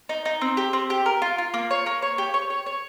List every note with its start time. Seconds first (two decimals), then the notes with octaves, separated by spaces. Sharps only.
0.09 D#4
0.25 D#4
0.41 C4
0.57 G4
0.73 C4
0.90 G4
1.06 A#4
1.22 F4
1.38 F4
1.54 A#3
1.71 C#5
1.86 A#3
2.02 C#5
2.18 G4
2.34 C#5
2.50 C#5
2.66 C#5